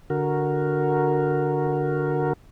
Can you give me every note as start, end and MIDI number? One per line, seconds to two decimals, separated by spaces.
0.10 2.33 50
0.10 2.33 66
0.10 2.33 70